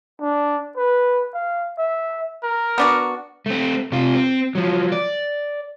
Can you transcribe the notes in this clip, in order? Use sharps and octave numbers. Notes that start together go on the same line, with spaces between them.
D4
B4
F5
E5
A#4
B3 D4 F#4
A3 C4
C3 F4
C4
F3 F#3
D5